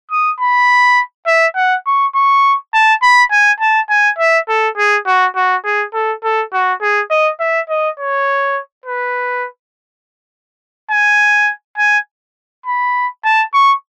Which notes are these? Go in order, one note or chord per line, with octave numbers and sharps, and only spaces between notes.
D#6
B5
E5
F#5
C#6
C#6
A5
B5
G#5
A5
G#5
E5
A4
G#4
F#4
F#4
G#4
A4
A4
F#4
G#4
D#5
E5
D#5
C#5
B4
G#5
G#5
B5
A5
C#6